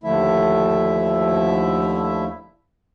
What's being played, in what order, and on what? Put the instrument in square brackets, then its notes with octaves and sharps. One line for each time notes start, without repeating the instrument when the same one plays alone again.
[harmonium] D#2 D3 F3 A3 E4 E5